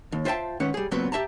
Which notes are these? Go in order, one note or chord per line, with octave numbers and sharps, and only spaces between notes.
D#2
F4 C5 E5 G5 A5
G#2 D#3 C#4 B4 F#5
G3 G#4
C#2 A#2 F#3 B3 C4 B4
G4 E5 A5 A#5